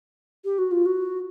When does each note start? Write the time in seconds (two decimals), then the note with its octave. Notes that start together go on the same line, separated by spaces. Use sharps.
0.45 G4
0.58 F#4
0.71 F4
0.86 F#4